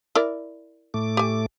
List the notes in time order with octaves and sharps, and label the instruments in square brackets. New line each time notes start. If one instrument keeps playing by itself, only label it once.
[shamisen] E4 A#4 D5
[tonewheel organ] A2 A3 D6
[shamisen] G4 G#5